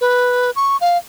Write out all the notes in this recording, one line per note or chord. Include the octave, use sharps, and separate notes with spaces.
B4
C#6
F5